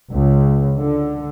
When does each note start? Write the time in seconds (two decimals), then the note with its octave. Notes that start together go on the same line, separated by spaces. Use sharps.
0.12 C#2
0.77 D3